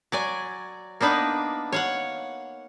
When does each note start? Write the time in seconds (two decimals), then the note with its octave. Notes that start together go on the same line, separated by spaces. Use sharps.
0.12 F#3 D5 G#5
1.01 A#3 B3 D4 D#4 B4
1.72 C#5 F5 F#5